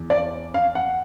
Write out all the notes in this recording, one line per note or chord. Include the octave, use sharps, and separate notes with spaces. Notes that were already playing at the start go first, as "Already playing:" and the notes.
Already playing: E2
D5
F5
F#5